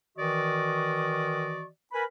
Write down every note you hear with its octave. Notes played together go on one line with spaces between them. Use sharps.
D#3 E3 F#4 D5 D#5 C#6
A#4 B4 G#5 B5